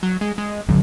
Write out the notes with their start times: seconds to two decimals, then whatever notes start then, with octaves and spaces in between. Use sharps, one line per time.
0.03 F#3
0.21 G#3
0.38 G#3
0.69 A1 D3 F#3